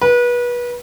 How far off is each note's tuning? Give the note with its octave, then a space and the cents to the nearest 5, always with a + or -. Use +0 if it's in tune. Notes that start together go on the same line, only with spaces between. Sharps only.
B4 -30